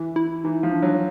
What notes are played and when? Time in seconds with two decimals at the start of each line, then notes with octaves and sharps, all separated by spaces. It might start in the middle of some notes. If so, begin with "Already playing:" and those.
Already playing: E3
0.16 E4
0.44 E3 D#4
0.63 F3
0.73 D4
0.82 F#3